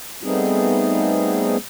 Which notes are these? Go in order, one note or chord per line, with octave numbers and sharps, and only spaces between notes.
G3 A3 B3 C4 D#4 G#4